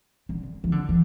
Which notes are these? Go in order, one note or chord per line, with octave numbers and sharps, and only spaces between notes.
D3
E3
D3
E3